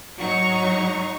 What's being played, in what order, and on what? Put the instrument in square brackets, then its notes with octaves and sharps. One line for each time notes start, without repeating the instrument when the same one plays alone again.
[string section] G#2 F#3 D#4 A#5 C#6